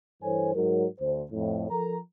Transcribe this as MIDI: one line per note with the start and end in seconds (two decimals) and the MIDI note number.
0.23 0.52 43
0.23 0.52 52
0.23 0.52 69
0.23 0.52 72
0.23 0.52 73
0.23 0.52 80
0.55 0.86 44
0.55 0.86 54
0.55 0.86 70
1.01 1.23 38
1.01 1.23 72
1.32 1.67 41
1.32 1.67 45
1.71 1.96 53
1.71 1.96 69
1.71 1.96 70
1.71 1.96 82